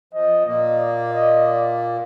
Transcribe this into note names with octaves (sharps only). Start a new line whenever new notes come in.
F2 F3 D#5
A#2 A#3 D#5
D5
D#5
D5